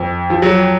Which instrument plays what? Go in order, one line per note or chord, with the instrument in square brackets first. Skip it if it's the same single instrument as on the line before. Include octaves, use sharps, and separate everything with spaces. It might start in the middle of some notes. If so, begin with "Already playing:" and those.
Already playing: [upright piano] F2
F3
[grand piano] F#3